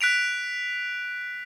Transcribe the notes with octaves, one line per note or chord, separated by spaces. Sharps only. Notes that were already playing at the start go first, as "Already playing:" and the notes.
F#6 B6 D7 F7